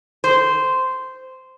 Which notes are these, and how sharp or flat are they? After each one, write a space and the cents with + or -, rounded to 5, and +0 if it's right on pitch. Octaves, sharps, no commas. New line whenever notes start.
C5 -10